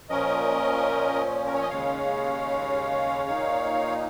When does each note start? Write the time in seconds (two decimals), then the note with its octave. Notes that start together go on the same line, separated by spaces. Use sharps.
0.10 A#2 F3 C#4 A#4 D#5
1.46 A#4
1.54 C#5
1.61 D#5
1.70 D#2 C#3 G#3 C#4 C#5 F5
3.29 A#2 A#3 D#4